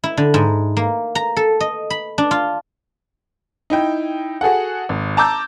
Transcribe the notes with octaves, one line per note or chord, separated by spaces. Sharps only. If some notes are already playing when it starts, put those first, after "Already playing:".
E4
D3
G#2
A#3
A#5
A4
D#5
B5
D4
F4
D#4 E4 G5
F#4 G#4 A4 F#5
G#1
A5 A#5 D6 E6 G6